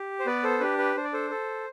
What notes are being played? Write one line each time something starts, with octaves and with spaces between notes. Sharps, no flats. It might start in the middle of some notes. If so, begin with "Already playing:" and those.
Already playing: G4
C5
B3 B4 D5
A4 C5
D4 G4 B4
B4
D4 C5
D5
A4 C5
A4